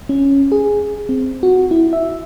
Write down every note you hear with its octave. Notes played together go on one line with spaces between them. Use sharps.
C#4
G#4
C4
F#4
E4
E5